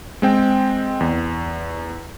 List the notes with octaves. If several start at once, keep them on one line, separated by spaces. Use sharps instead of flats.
G#3 C4 G5
E2